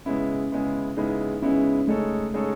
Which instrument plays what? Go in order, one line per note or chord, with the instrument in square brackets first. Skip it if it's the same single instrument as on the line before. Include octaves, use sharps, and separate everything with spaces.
[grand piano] C#3 G#3 B3 E4 [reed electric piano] C#4
[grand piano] C#3 G#3 B3 E4
[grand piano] C#3 G#3 B3 E4 [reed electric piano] D#4
[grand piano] C#3 G#3 B3 E4 [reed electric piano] C#4
[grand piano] C#3 G#3 D#4 A4 C#5 [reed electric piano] A3
[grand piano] C#3 G#3 D#4 A4 C#5